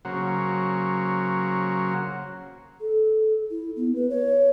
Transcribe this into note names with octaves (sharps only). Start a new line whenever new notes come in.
C#3 F#3 A#3 F#4 C5
A4
E4
B3
B4
C#5